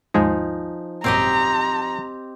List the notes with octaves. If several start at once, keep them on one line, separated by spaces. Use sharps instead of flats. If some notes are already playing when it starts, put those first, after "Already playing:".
D#2 G#2 F3 G#3 D#4 G#5
G#1 F#2 A#2 C4 G4 D#5 A#5